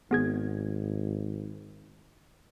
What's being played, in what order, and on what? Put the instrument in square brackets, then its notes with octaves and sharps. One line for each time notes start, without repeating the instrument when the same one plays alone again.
[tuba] G#1 [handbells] B3 G#4 G#6